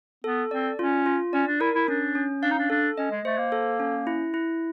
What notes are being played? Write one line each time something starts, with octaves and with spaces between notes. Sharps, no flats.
B3 A4
C4 D5
C#4 F4
F4
C#4 D5
D4
E4 A#4
E4
C#4 D4
C#4
D4 F5
D#4
D4
D4 A4
C#4 D#5
G#3
A3 C5
A#3
A4
C#4
E4
E4